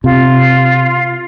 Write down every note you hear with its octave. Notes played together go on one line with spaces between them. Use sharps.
C3 F4